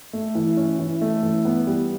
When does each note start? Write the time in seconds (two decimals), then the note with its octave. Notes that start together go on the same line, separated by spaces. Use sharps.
0.13 A3
0.35 E3
0.57 C#4
0.79 E3
1.01 A3
1.23 E3
1.45 B3
1.67 G3